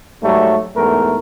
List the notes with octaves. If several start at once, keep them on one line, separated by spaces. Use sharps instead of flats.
G#2 F#3 G3 A3
E2 G#2 A3 A#4